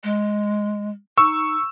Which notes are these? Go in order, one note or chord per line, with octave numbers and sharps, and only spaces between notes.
G#3
D#4 C#6 E6